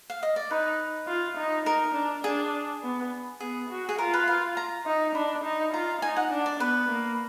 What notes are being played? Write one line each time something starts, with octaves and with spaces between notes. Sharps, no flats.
F5
D#5
D5
D#4 B4
F4
D#4
D#4 A#4
D4
D4 G#4
B3
B3 G#4
F#4
G#4
F4 A#4
B4
F5
A#5
D#4
D4 B5
D#4
F4 A#5
D#4 G#5
F#5
D4
D5
B3 B4
A#3